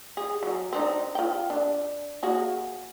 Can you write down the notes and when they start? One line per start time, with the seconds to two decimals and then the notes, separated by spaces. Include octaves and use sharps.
0.17 G#4
0.43 F#3
0.73 C4 D4 D#4
1.15 F4 G5
1.50 D4
2.23 A#3 F#4 G#4